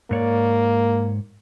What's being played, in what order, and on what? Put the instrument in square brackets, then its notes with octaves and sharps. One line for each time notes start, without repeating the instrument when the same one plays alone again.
[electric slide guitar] G#2 C#5 D5 [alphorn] A#3